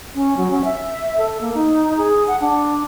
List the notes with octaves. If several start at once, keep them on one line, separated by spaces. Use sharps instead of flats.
C#4
F#3
C#4
E5
A4
A#3
D#4
G#4
F#5
D4